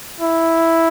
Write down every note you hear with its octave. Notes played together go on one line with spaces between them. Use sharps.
E4